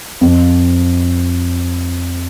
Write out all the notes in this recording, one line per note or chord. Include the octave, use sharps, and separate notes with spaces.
F2